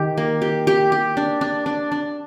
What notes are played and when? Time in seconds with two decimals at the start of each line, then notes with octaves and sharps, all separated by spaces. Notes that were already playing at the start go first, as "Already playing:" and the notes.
Already playing: D#3 G4
0.17 A#3
0.42 G4
0.67 G4
0.92 G4
1.17 D4
1.41 D4
1.66 D4
1.92 D4